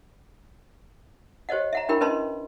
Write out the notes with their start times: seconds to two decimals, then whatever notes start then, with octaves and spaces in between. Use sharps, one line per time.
1.49 G4 C5 C#5 D#5 F#5
1.73 E5 F#5 A#5
1.89 D4 E4 G4 A#4 G5 B5
2.01 C#4 B4 D#5 A5 C6